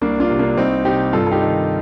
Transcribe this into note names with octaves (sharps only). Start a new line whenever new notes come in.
C2 A#3 D4
D4 F4
C3
A#3 D4
C2 C4 D#4
C3 D#4 G4
G2 F4 A4
A4
D#4 G4
D#3